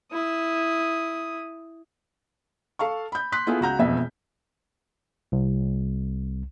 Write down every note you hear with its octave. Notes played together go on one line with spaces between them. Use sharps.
E4 D#6
A4 F5 A5 C#6
B5 G6
C6 F#6 B6
B3 E4 F4 G#4 A4
C#2 F#4 A#5 G6
E1 F2 B2 B3 E5
C2